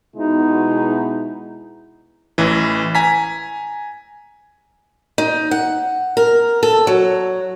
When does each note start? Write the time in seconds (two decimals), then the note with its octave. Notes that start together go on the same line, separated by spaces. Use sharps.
0.16 B2 G#3 D#4 E4
2.38 A1 E3
2.95 G#5 A#5 B6
5.18 D#4
5.51 F#5
6.17 A#4
6.63 A4
6.87 F#3